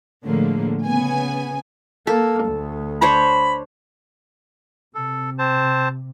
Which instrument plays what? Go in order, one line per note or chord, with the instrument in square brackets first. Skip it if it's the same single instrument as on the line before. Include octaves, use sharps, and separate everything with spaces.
[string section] A2 D3 F3 G#3 A#3
C#3 B3 G#5
[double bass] A#3 [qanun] A4
[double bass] D2
[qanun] D4 C5 C#5 [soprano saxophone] B5
[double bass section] C3 [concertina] A4
[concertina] C4 C5 A5